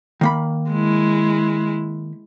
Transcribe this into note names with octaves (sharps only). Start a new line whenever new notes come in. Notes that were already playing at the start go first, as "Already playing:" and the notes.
D#3 A#3 B5
G#3 E4